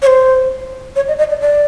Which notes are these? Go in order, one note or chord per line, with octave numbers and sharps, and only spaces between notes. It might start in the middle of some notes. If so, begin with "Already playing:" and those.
C#5
C5
C#5
D#5
D#5
D5
D5